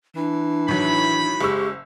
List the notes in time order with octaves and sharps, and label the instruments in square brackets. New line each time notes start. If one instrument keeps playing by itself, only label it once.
[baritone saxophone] E3 [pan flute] D4
[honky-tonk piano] A2 D#3 F#3 [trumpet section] B5
[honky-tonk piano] F#1 C#6 E6 [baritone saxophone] G#3 [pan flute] G4